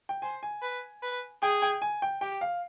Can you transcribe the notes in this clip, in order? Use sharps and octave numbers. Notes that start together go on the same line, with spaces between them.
G5
C5 G#5
G#5
B4
B4
G#4 G5
G5
G#5
G5
G4 G5
F5